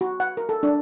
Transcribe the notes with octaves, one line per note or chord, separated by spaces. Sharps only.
F#4
F#5
A#4
A4
D4